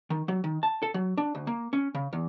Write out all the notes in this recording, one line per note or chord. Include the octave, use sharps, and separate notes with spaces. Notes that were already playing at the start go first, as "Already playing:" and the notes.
D#3
F#3
D#3
A5
A4
F#3
D4
D2
A#3
C#4
C#3
E2